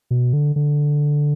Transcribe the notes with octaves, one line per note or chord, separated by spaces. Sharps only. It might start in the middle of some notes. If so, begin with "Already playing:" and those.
B2
D3
D3